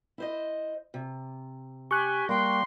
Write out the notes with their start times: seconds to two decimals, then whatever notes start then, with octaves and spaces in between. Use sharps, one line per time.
0.18 E4 C5 D#5
0.94 C3
1.91 G4 G#5 C#6 F#6
2.29 G3 A#3 A#4 G5 C6